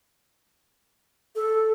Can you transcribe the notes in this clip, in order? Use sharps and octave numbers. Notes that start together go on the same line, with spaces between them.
A4